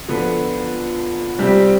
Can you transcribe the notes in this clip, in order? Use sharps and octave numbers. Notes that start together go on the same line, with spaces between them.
D3 F3 B3
C3 G3 C4 G4